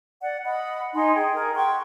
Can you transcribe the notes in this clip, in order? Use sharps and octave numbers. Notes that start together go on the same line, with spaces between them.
D5 F#5
D#5 F#5 B5
D#4 D#5 G#5 C6
G#4 G5
G#4 A#4
F#5 G5 C6 C#6